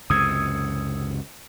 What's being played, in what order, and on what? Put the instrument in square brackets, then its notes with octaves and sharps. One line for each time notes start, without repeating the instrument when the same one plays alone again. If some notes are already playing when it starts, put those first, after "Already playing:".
[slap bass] C#2 F#2 C3 [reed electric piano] D#6 E6 G#6